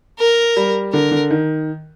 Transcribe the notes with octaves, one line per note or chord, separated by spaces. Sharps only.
A#4
G3
D3 A#4
D3
D#3